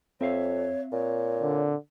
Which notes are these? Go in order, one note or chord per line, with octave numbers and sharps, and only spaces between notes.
F2 C4 C#5 E5 F5
A#2 C#5
D3